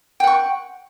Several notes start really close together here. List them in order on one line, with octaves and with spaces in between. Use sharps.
G5 F#5 C#6